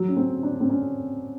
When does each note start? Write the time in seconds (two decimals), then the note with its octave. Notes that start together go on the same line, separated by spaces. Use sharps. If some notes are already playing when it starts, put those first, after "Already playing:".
Already playing: F#3
0.08 C#4
0.16 C4
0.43 D4
0.60 C4
0.69 C#4